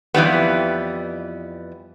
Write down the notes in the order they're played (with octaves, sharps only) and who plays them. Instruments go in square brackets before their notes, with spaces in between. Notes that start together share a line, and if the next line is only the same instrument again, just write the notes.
[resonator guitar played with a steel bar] F2 E3 G3 B3